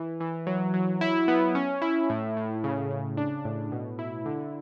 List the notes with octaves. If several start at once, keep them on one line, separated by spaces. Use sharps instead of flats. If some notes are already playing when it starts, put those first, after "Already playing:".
Already playing: E3
E3
F#3
F#3
E4
B3
C#4
E4
A2
A2
C#3
C#3
D4
A2
B2
E4
D3